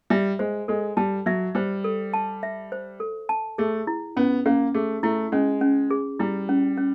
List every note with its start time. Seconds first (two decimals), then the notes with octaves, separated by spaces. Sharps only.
0.10 G3 E5
0.39 G#3 C5
0.68 G#3 A4
0.97 G3 A5
1.26 F#3 E5
1.55 G3 C5
1.84 A4
2.14 A5
2.43 E5
2.72 C5
3.00 A4
3.29 A5
3.58 A3 G#4
3.87 E4
4.17 B3 C#4
4.46 A#3 C#4
4.74 A3 G#4
5.03 A3 E4
5.32 G#3 C#4
5.61 C#4
5.91 G#4
6.19 G3 E4
6.49 C#4
6.77 C#4